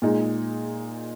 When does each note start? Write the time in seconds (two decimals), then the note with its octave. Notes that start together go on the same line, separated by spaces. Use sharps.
0.02 A#2 G#3 D#4